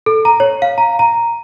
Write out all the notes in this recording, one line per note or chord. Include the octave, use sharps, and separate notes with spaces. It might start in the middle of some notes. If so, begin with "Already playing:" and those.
A4
A#5
C#5
F5
A#5
A#5